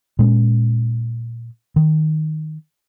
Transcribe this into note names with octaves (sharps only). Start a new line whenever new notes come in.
A#2 G#3 C#4
D#3